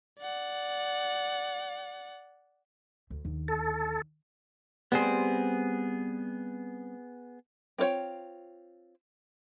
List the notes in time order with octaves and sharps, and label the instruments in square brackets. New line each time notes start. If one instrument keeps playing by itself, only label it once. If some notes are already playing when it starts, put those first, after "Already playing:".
[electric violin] D5 F#5
[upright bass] D2
D#2 D3
[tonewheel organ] A4
[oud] G3 C4 C5 [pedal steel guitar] B3 G#4
[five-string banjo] C4 F4 B4 C#5 G5